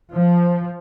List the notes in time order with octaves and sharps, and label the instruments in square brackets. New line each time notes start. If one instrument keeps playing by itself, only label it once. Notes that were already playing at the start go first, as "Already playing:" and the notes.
[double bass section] F3